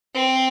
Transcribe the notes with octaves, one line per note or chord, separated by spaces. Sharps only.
C4